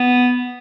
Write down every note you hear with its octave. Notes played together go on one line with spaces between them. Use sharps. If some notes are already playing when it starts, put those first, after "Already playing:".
Already playing: B3